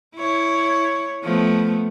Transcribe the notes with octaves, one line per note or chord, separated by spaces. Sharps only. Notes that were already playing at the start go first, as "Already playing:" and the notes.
E4 C#5
F3 A3 B3